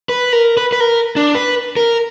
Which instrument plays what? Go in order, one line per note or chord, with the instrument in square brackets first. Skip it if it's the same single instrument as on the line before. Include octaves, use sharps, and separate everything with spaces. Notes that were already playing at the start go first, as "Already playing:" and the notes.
[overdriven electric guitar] B4
A#4
B4
B4
A#4
D4
B4
A#4